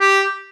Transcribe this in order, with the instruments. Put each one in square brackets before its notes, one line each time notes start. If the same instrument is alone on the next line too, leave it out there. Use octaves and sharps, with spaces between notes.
[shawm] G4